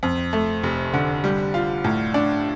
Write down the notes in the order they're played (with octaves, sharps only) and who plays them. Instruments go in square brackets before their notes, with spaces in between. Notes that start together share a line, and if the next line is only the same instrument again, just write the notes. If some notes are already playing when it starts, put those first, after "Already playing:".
[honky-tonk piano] F2
A3
F1
D3
G3
F4
A2
D4